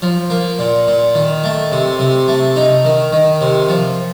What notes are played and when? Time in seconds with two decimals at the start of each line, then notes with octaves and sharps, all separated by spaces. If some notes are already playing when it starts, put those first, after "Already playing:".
0.02 F3
0.30 A#3
0.59 A#2
0.87 A#2
1.15 D#3
1.44 A3
1.72 C3
1.99 C3
2.28 A3
2.56 D#4
2.85 D#3
3.13 D#3
3.41 C3
3.69 F3